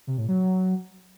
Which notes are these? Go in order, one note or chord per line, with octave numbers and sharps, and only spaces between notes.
C3
A2
F#3